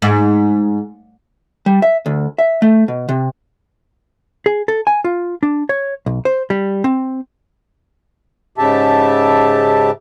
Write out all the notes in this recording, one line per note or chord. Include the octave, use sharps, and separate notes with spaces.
G#2
G3
E5
D2
E5
A3
B2
C3
G#4
A4
G#5
F4
D4
C#5
B1
C5
G3
C4
G#2 C#3 G4 E5 A5